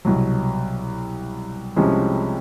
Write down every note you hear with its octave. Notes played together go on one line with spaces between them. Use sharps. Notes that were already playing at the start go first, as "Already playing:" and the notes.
C2 B2 F#3
C2 C3 F3 G#3 C#4